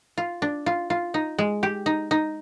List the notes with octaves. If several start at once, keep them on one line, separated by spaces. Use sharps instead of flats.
F4
D4
F4
F4
D#4
G#3
G4
D#4
D#4